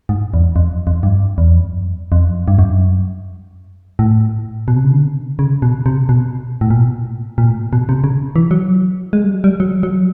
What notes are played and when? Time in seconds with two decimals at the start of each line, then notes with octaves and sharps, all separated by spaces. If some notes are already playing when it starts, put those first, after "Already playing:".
0.09 G#2
0.34 E2
0.41 F2
0.56 F2
0.87 F2
1.03 G2
1.38 E2
1.51 F2
1.64 F#2
2.12 F2
2.48 G2
2.59 F#2
3.99 A2
4.68 B2
4.76 C3
4.84 C#3
4.92 D3
5.39 C#3
5.62 B2
5.86 C3
6.09 B2
6.61 A2
6.70 A#2
6.79 B2
7.38 A#2
7.49 A2
7.73 B2
7.89 C3
8.04 C#3
8.36 E3
8.51 F#3
9.13 G#3
9.24 G3
9.34 F#3
9.44 G3
9.60 F#3
9.83 F#3